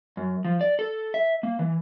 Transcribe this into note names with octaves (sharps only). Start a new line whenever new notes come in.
F#2
F3
D5
A4
E5
A#3
E3